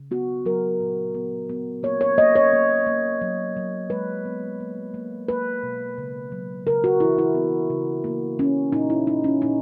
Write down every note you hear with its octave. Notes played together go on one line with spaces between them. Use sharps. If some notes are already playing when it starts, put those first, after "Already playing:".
Already playing: C#3
B3 F#4
F#3 A#4
A#2
B3
B3
A#3 C#5
C#5
A#3 D#5
C#5
A#3
A#3
F#3
F#3
G#3 B4
B3
A#3
A#3
A#3 B4
B2
C#3
F#3
C#3 A#4
F#4
E3 E4
E4
B3
C#3
A#3
A#3 C#4
A#2 D#4
E4
A#2 D#4
C#4
A#2 D#4